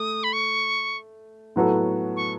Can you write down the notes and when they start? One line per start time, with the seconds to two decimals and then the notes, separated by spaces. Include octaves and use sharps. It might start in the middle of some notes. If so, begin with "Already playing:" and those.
Already playing: A3 D#6
0.23 B5
0.33 C#6
1.56 A2 F#3 B3 F#4 A4
2.16 C#6